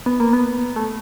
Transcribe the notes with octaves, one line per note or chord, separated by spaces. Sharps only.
B3
A#3
B3
A3